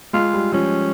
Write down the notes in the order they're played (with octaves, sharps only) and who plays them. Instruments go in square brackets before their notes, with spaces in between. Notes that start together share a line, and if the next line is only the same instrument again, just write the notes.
[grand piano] G#3 [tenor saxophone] F4
[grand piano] G3
[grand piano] F3 [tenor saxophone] C#4